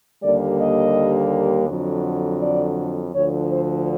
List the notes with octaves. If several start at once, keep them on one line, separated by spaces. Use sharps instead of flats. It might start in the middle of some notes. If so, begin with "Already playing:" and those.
D#2 D3 G3 A#3 D5
D#5
F2 D3 F#3
D5
D2 D3 F3 C#5
C5